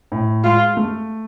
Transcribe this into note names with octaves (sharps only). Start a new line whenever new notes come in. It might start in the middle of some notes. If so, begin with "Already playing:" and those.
A2
G#3 F4
A3